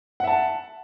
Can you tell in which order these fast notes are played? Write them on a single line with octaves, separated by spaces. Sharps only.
F#5 E5 A5